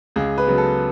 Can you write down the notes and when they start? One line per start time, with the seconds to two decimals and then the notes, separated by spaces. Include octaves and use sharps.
0.16 C#2 G#4
0.38 B4
0.47 C#3 F#3 B3
0.58 A4